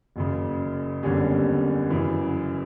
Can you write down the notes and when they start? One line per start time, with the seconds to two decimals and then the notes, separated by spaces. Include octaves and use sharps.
0.16 F#1 F#2 C#3
1.03 F#1 E2 D3 G3 C#4
1.90 F#2 C#3 E3